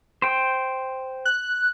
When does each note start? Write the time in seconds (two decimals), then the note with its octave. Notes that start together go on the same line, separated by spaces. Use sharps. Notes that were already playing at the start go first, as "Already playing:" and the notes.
0.22 C5 G5
1.25 F#6